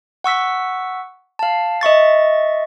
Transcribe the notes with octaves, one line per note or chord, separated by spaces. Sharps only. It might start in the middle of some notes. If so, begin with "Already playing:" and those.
F#5 C#6 E6 B6
F5 A5
D#5 E5 C#6 A6